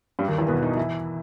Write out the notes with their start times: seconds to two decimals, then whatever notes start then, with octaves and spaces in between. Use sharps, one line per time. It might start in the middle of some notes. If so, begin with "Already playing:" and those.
0.19 G2 G3
0.28 D#2 D#3
0.38 E2 E3
0.48 B2 B3
0.63 D#3 D#4
0.77 E3 E4